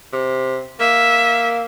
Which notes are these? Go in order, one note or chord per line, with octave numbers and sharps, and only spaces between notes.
C3
A#3 E5